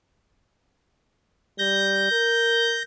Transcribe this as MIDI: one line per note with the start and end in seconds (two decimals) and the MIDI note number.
1.58 2.08 55
1.58 2.82 91
1.58 2.82 94
2.11 2.82 70